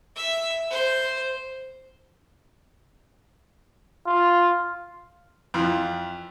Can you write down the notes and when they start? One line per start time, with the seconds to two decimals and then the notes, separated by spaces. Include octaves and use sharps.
0.16 E5
0.70 C5
4.07 F4
5.54 F2 E3 F4